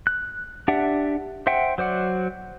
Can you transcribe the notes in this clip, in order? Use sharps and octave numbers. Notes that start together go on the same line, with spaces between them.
F#6
D4 G4 D5 E5 F#5
C5 E5 F#5 G5
F#3 C5 D5 F#5